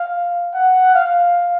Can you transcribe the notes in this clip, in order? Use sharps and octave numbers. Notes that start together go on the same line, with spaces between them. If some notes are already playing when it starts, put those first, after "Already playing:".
Already playing: F5
F#5
F5